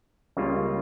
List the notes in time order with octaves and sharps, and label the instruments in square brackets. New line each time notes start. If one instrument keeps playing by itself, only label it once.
[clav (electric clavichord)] C#2 C#3 G3 A#3 F4